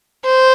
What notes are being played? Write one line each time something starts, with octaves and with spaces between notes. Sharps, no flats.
C5